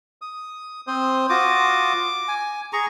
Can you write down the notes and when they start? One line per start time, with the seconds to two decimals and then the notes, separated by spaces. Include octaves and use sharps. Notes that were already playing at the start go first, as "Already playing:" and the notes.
0.22 D#6
0.87 C4 C5 D#6
1.29 F4 F#4 D6 D#6
2.28 G#5
2.73 G#4 A#5 C#6